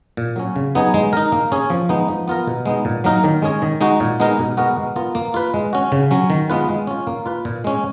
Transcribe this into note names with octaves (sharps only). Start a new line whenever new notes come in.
A#2
F#3 C#4
C#3
F#3 B3 D#4 G#4
G#3
D#4 A#4
A#3
C#4 G#4
F3
G#3 B3 D#4
F3
B3 F4 A#4
B2
G#3 B3 D#4
A#2
F#3 A#3 D#4 A#4
D#3
G#3 C#4 G#4
D#3
G#3 D#4 F#4
A#2
G#3 B3 D#4 A#4
B2
G#3 B3 F#4 A#4
G#3
B3 F4 A#4
A#3
F4 B4
G#3
C#4 F#4
C#3
F#3 C#4
D#3
G#3 B3 F4 B4
G#3
C#4 F4
A#3
F4 B4
A#2
G#3 C#4